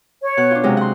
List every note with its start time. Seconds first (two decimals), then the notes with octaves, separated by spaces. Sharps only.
0.23 C#5
0.37 B2 F#6
0.51 D4 F4
0.64 C3 F#3 G#3
0.77 F#5 C6